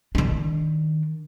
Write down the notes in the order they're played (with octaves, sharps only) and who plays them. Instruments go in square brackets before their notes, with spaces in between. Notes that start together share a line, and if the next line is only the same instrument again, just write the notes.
[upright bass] D#3 D4